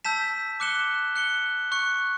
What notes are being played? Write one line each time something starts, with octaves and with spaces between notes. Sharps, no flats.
A5 E6 G6 B6 E7
D6 F#6 C#7 E7 G7
F#6 C#7 G7
C#6 F#6 C#7